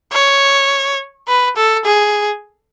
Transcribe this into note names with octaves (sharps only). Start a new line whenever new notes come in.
C#5
B4
A4
G#4